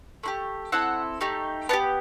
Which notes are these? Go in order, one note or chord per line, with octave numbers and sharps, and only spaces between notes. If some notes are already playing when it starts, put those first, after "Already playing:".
A3 E4 G4
C4 E4 A4 F#5
A3 D#4 G4
B3 D#4 G4 A5